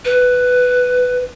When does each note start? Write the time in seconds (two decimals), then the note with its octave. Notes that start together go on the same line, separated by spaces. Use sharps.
0.05 B4